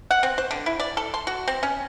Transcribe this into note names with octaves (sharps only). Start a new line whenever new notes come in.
F#5
C4
C5
D3
E4
D5
A4
C6
F#4
C4
C#4